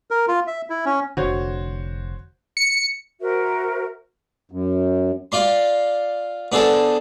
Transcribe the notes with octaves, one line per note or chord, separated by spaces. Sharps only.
A#4
F4
E5
E4
C#4
F1 D3 F#4 C5 C#5
C#7
F#4 A#4 C5 E5
F#2
F4 D5 C6
B3 D4 G#4 A4 C5